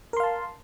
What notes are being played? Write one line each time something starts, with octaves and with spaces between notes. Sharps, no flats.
A#4 F5 A5 C6